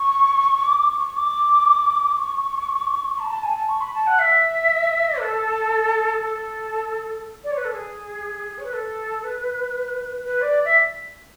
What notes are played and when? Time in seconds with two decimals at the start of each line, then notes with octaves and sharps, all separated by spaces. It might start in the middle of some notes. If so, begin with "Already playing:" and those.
Already playing: C#6
0.65 D6
0.82 C#6
0.98 C#6
1.16 D6
2.17 C#6
3.18 A5
3.25 B5
3.30 A5
3.43 G#5
3.56 A5
3.68 C#6
3.80 B5
3.93 A5
4.06 F#5
4.18 E5
5.19 A4
6.20 A4
7.43 D5
7.50 C#5
7.56 B4
7.64 A4
7.72 G#4
8.57 C#5
8.64 B4
8.73 A4
9.23 B4
10.24 B4
10.41 D5
10.64 E5